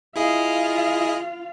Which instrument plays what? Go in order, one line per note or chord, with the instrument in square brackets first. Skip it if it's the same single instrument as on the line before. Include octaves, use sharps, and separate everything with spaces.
[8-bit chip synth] E4 G#4 D#5 [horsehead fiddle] F4 F5